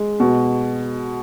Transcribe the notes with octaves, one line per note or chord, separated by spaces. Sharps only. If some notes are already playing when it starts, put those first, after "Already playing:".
Already playing: G#3
B2